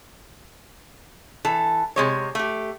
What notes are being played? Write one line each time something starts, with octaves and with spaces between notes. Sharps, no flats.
E3 A4
C3 G#3 C#5
A3 G4